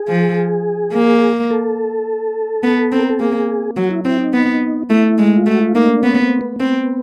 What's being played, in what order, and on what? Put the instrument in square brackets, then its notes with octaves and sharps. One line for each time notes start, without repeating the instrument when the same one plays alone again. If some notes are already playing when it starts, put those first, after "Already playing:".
Already playing: [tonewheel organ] G#4
[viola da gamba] F3
A#3
[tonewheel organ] A4
[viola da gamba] B3
C4
[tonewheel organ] A#4
A4
[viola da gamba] A#3 [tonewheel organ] G#4
[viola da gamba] F#3 [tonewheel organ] F#4
[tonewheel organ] E4
[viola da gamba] C4 [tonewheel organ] E4
[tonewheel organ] D#4
[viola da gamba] B3
[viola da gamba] A3 [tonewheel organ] E4
[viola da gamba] G#3
[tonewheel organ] F4
[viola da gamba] A3 [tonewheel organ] F#4
[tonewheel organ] F4
[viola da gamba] A#3 [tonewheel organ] D#4
[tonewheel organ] D4
[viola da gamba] B3 [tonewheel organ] C#4
[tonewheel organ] C4
B3
[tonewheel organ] B3 [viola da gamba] C4